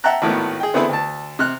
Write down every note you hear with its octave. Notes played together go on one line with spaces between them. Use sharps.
E5 F#5 G5 A5 A#5 F#6
G#1 A2 D#3 B3
G#4 G5
D3 B3 C4 E4 G#4 B4
D2 A5
C3 F6 F#6